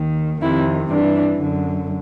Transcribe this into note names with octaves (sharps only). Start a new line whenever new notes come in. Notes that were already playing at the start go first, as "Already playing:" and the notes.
Already playing: D#2 D#3
F2 C3 D#3 E4
G2 E3 D4
F#2 D3